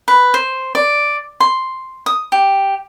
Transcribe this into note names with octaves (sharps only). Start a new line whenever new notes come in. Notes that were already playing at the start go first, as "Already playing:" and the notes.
B4
C5
D5
C6
D#6
G4